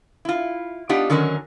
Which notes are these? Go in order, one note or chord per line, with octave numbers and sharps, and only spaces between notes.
E4 F4
B3 D4 D#4 F4 G4 F#5
D3 D#3 F#3 C#4 A#4